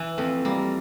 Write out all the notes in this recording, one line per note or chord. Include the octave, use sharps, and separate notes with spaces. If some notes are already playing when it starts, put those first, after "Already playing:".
Already playing: E3
F2 A3
G3 A#3